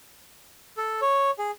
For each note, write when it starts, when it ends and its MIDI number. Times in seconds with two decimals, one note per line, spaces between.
0.77 1.00 69
1.01 1.31 73
1.39 1.51 68